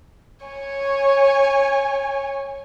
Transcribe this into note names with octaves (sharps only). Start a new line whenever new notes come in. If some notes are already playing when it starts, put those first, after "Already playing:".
C#5 G#5